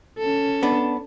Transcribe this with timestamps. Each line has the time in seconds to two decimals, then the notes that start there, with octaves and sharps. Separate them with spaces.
0.19 C#4 A4
0.63 B3 D4